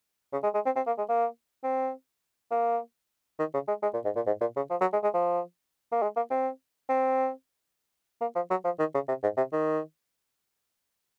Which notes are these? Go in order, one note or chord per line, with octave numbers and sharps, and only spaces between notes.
C#3
G#3
G#3
C4
C4
A#3
G#3
A#3
C4
A#3
D#3
C#3
G#3
G#3
A#2
G#2
A#2
G#2
A#2
C#3
F3
F#3
G#3
G#3
F3
A#3
G#3
A#3
C4
C4
A#3
F3
F#3
F3
D#3
C#3
C3
G#2
C3
D#3